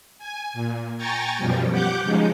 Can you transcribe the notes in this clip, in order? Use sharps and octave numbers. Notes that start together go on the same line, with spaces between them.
G#5
A#2
G5 G#5 A#5 C#6 A6
F#2 B2 F3 G3
G4 F#5 D6 G6
C#3 F3 G#3 D#4